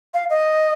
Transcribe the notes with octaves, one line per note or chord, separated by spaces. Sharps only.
F5
D#5